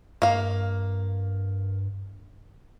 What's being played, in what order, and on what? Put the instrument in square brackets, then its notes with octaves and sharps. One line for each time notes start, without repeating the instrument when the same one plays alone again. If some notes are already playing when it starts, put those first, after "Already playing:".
[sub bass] G2 [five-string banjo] A#3 F5